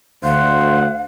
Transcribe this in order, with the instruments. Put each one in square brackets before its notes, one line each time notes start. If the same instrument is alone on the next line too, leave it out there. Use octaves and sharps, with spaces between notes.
[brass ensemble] D2 [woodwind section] C5 F#5 [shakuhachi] F5